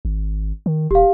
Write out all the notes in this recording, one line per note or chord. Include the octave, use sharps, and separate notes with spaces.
G#1
D#3
D#1 G4 F5